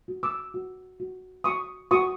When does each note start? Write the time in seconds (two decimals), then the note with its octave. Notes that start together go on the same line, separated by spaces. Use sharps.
0.08 F#4
0.23 D6 E6
0.54 F#4
1.00 F#4
1.44 F#4 C#6 D#6
1.91 F#4 C#6 D#6